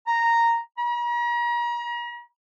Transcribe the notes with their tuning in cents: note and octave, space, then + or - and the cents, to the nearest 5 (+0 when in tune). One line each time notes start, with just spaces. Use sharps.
A#5 -5
A#5 +40